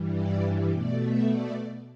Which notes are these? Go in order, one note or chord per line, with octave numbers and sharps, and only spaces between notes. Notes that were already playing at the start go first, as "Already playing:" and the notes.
Already playing: G2 E3 G3
D5
B2 A3 D5
E5
D5